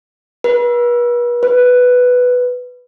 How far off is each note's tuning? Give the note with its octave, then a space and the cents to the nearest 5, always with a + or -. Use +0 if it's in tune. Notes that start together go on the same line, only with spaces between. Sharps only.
B4 -40
B4 +5